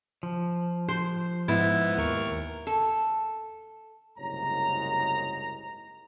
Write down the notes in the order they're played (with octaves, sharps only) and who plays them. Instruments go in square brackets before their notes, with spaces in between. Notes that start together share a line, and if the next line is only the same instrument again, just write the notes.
[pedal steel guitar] F3
[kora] C5
[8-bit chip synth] G#2 B3 [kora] E4
[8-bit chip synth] D#2 A#4 C#6
[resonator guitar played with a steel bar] A4
[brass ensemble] F#1 C2 G#2 C#5 A#5